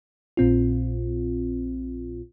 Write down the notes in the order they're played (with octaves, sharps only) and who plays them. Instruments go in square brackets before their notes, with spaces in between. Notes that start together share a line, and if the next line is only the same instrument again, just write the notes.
[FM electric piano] A#1 A#2 C4 F4